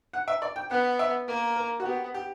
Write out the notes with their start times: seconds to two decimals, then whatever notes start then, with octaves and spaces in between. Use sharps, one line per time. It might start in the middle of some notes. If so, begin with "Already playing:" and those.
0.13 F#5
0.28 E5
0.42 D5
0.56 G5
0.71 B3 F#5
0.99 E5
1.27 A#3 A#4
1.56 A#4
1.80 F#4
1.85 B3 G4
2.14 G4